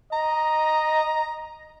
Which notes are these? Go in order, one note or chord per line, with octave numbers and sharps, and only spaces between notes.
D#5 A#5